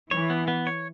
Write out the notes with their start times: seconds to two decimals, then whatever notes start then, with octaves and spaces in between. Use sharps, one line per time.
0.11 E3 C#5
0.30 B3
0.48 B3
0.67 C#5